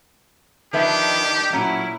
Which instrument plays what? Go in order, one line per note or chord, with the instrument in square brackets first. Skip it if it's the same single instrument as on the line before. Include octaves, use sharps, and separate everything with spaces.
[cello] D#3 D4 [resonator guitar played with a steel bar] F3 B4 E5 [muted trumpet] G4
[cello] A#2 E4 [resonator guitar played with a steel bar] F#3 A3 C#4